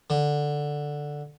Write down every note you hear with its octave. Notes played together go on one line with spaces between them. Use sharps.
D3